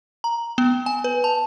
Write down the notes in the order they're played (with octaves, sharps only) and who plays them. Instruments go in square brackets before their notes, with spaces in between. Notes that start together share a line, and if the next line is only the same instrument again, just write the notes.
[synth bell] A#5
B3
G#5
B4
A5